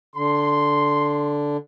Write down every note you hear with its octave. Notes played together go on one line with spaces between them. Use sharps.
D3 C6